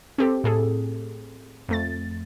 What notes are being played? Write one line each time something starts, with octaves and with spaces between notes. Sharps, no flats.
C4 G4 A4
A2 G#4 A4
F2 A3 A6